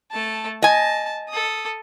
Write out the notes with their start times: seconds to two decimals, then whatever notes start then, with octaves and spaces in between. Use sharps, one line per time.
0.12 A3 A5
0.62 D#5 G#5 A5
1.30 A4 D#6